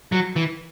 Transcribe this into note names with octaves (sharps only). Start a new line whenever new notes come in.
F#3
E3